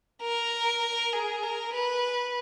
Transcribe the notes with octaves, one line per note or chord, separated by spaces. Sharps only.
A#4
G#4
A#4
B4